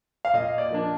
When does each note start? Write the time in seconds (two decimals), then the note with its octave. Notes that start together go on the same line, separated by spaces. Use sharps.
0.25 F5
0.33 A#2 D#5
0.58 D5
0.71 F3 A#3 D4